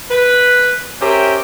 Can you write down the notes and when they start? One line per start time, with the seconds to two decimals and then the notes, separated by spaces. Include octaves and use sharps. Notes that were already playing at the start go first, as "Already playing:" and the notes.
0.11 B4
1.02 C#4 G4 A#4 C5 E5 G5